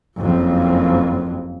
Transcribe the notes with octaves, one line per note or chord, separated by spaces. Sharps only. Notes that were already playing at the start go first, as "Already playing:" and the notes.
F#1 F2